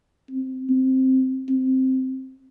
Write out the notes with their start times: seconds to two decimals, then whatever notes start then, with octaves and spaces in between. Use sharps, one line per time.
0.31 C4
0.70 C4
1.49 C4